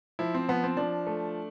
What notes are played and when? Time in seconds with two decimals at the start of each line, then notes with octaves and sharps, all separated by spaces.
0.19 F3 E4
0.35 C4
0.48 F3 B3
0.63 C4
0.77 F3 D4
1.07 A3